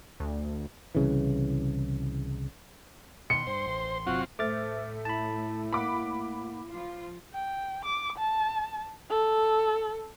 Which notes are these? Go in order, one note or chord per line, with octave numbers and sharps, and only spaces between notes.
D2
C2 C#3 E3
B2 D3 D#3 C6 C#7
G2 C5
A1
G1 C3 F#3 C4 F4 F#4 F#5
A2 A3 C5 D6 F6 A6
E4 A5 B5
A#3 F#5 B5 D6
F3 F4
G5
D6
A5
A4